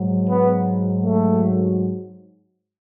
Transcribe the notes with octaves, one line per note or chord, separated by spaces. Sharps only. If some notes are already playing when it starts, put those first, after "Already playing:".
Already playing: G#2 F#3
B3
A3